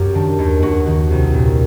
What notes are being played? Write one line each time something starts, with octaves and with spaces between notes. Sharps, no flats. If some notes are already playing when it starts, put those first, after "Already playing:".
Already playing: F#2 G4
D#3 D4
D#2
D#2 F#4
D#3
C2
A#2